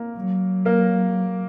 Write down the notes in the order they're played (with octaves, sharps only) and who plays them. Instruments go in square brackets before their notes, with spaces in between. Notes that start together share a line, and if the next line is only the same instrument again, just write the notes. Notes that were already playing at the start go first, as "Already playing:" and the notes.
Already playing: [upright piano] A#3 A#4
[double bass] F#3
[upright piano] A#3 A#4